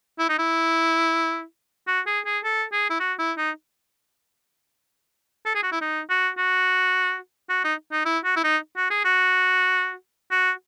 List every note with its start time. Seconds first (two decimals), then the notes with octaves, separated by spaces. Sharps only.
0.19 E4
0.29 D#4
0.39 E4
1.87 F#4
2.07 G#4
2.26 G#4
2.44 A4
2.72 G#4
2.90 E4
3.00 F#4
3.19 E4
3.37 D#4
5.46 A4
5.55 G#4
5.63 F#4
5.72 E4
5.81 D#4
6.10 F#4
6.38 F#4
7.50 F#4
7.64 D#4
7.92 D#4
8.06 E4
8.24 F#4
8.36 E4
8.44 D#4
8.77 F#4
8.90 G#4
9.05 F#4
10.31 F#4